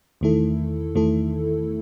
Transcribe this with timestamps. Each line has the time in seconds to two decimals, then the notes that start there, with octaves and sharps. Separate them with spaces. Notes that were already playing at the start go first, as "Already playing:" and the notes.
0.21 E2 D#3 A3 E4 A4
0.95 E2 D#3 A3 E4 A4